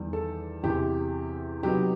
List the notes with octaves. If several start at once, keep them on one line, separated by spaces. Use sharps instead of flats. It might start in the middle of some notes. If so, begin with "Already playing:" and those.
Already playing: E2 D#3 G3
A4
E2 C3 E3 G4
C3 F#3 B3 D#4 G4